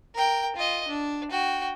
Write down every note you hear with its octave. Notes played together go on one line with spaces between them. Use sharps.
A#4 G5
F4 D#5
D4
F#4 G5